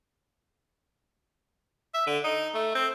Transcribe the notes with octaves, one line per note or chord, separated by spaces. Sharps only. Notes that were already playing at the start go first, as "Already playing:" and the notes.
E5
D3
D#4
A3
C4